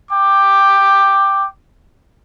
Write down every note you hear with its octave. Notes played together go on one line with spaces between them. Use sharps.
G5 D6